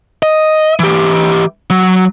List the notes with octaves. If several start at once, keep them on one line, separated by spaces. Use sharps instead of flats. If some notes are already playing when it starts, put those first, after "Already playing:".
D#5
E3 G4
F#3